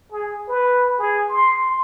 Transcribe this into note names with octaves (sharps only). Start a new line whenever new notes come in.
G#4
B4
G#4
C6